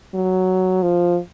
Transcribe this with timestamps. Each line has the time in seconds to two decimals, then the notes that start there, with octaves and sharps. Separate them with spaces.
0.14 F#3
0.83 F3